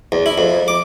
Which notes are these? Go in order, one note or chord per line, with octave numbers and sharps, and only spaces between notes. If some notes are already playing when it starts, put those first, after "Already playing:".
E2
E4
F2
D6